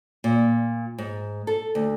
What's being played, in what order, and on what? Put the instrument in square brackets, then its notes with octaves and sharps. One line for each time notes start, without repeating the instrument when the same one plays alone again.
[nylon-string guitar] A#2
G#2
A4
D2